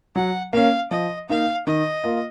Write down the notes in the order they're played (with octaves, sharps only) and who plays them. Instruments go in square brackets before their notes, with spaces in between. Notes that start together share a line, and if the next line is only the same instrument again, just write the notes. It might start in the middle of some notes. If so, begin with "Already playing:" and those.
[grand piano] F#3 [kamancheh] F#5
[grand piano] A#3 C#4 [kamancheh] F5
[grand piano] F3 [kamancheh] D#5
[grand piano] A#3 D#4 [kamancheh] F5
[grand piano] D#3 [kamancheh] D#5
[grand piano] A#3 F4